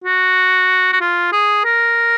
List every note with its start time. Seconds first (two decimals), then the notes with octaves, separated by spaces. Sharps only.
0.04 F#4
0.93 F#4
1.00 F4
1.32 G#4
1.65 A#4